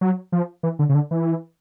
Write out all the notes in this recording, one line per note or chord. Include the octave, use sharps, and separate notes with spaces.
F#3
F3
E3
D3
C#3
D3
E3